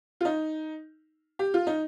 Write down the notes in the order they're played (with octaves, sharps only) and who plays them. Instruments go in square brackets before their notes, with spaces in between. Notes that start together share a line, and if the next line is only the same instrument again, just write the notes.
[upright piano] F4
D#4
G4
F4
D#4